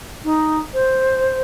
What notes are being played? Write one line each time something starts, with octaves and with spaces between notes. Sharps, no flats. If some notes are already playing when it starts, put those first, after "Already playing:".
D#4
C5